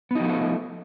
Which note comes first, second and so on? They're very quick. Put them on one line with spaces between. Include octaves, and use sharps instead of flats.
B3 D#4 F3 A3 A4